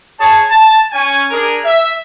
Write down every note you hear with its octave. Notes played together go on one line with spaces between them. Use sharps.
G#4 C#5 A5
A5
C#4 G#5
D4 G#4 A#4
E5